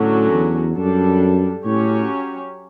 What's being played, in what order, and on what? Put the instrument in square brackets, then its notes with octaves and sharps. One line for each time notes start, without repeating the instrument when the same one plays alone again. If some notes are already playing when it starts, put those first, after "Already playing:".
Already playing: [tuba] A2 [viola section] D3 F#3 C#4 F#4
[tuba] E2
[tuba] F#2 [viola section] G3 D4 A4
[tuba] A2 [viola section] F#3 C#4 G4 C#5